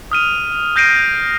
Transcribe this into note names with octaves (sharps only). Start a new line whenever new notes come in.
D#6 F6 D#7
F6 G6 A#6 C7 D7 D#7